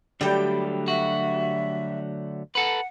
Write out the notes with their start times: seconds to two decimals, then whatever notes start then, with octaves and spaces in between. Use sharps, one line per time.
0.21 D3 F#3 G3 A3 G4 G5
0.88 F#4 E5
2.55 A4 B4 F#5